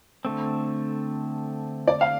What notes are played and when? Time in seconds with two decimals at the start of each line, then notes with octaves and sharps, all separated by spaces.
0.25 D3 A3 C4
1.87 D5
2.01 F5